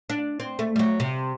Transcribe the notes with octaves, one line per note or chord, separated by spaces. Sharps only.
D4
C4
A3
G3
F#3
C3